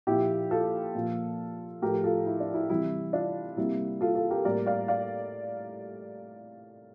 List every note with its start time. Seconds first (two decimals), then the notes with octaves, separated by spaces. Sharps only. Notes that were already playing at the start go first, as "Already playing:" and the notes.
0.07 A#2 F3 A#3 E4 G4
0.51 F4 A4
0.95 A#2 F3 A#3
1.82 A2 F3 A3 G4 A#4
2.04 F4 A4
2.26 E4
2.40 D4
2.54 E4
2.70 C3 E3 G3 E4
3.13 D4 F4
3.57 C3 G3 A#3 E4
4.01 F4 A4
4.15 F4 A4
4.30 G4 A#4
4.45 A2 G3 A#3 A#4 D5
4.66 D5 F5
4.88 D5 F5